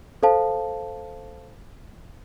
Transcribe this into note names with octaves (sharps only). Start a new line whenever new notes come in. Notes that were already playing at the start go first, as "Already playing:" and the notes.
A4 C5 F5 A5